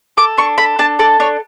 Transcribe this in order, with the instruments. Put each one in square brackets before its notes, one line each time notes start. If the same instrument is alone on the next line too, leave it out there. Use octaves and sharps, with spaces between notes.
[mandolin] A4 D6
D4 C#6
A4 B5
D4 A5
A4 D5
D4 C#5